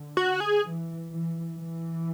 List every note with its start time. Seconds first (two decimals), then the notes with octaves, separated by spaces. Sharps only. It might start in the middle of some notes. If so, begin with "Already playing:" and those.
Already playing: D3
0.17 F#4
0.40 G#4
0.64 E3
1.10 E3
1.57 E3